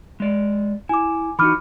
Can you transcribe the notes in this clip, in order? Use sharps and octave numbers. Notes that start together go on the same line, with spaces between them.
G#3 D5
E4 G#5 D6
E3 D#4 F#4 B5 D6 F6